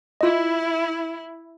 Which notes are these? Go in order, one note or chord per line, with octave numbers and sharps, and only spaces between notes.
E4 F4 D#5